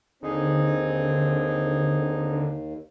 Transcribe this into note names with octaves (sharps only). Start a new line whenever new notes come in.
D#2 D3 C4 D#4 G#4